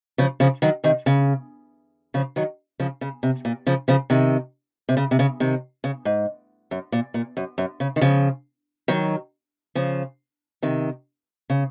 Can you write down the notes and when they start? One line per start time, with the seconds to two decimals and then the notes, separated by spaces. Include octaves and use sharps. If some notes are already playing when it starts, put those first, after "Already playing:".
0.18 C#3 F3
0.40 C#3 F3
0.62 D#3 F#3
0.84 C3 D#3
1.06 C#3
2.14 C#3 F3
2.36 D#3 F#3
2.80 C#3 F3
3.01 C#3
3.23 C3
3.45 A#2
3.67 C#3 F3
3.88 C#3 F3
4.10 C3 D#3
4.89 C3
4.97 C#3
5.11 C3
5.19 C#3
5.40 C3 D#3
5.84 C#3
6.05 G#2
6.71 F#2
6.92 A#2
7.14 A#2
7.37 F#2
7.58 F#2
7.80 C#3
7.96 D#3
8.01 C#3 F3
8.88 D#3 F#3
9.75 C#3 F3
10.63 C3 D#3
11.50 C#3